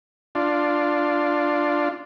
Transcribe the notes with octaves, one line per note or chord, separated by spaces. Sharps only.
D4 F4